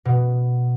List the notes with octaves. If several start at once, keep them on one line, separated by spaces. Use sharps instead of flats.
B2